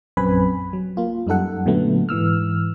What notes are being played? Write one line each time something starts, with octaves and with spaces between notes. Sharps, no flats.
A#1 F#2 C4 B4 G#5 B5
F#3
A#3 F4
F#2 G3 D#4 A4 F#5
A#2 D3 F#3 A3 B3
G#2 E3 E6 F6